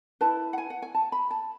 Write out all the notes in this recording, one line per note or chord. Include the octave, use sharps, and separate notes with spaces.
E4 B4 A5
F#5
G#5
F#5
G#5
A5
B5
A5